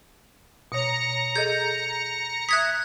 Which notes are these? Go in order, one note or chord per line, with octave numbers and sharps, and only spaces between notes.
B2 C#5 A#5 A#6 C#7
G#4 A4 D#5 G6
E5 D#6 F#6 G#6 B6